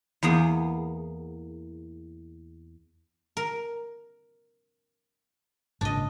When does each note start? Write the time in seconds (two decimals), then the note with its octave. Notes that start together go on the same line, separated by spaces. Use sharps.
0.23 E2 A#3 B3 G#4
3.37 A#4
5.81 G#1 A#2 C#3 D4 D#5